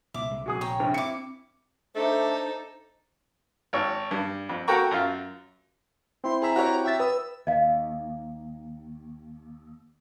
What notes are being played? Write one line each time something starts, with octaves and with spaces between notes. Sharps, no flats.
C2 A#2 E5 D6
C2 G#3
A#1 C3 F#4 G#4 D#6
C#5 G5 A#5
A#1 G2 C3
C4 E4 D6 C#7
A3 D4 D#4 A4 C5
G#1 C#5
G2
F2
F#4 A4 A#4 G5 A#5 C#6
F#2 F4 F5
C4 E4 C6
G#4 E5 A#5
F#4 G4 C#5
E5 G5 A6
B4 D#6 E6
D#2 D#5 F5